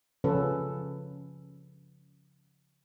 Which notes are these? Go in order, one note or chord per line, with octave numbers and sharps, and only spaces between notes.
C#3 F3 C#4 A4 B4